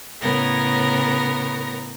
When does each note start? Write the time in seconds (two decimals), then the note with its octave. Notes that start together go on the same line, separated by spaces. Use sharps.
0.21 A2 C#3 B3 A#4 A#6